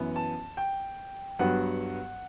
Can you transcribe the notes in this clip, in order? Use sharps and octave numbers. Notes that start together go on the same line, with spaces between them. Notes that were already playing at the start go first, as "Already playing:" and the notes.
Already playing: F#2 E3 B3
A5
G5
G2 F#3 B3 F#5